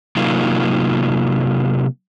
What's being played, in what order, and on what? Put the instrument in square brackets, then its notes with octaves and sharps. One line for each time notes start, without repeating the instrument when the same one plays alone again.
[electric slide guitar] C3 F#3 A#3 D#4 F4